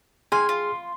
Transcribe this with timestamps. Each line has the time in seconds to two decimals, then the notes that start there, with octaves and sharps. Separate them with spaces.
0.32 G#4 G#5 C6 F6
0.49 F4